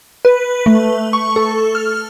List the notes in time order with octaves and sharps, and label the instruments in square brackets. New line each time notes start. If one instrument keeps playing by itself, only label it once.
[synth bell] B4
A3
C#6
A4
F6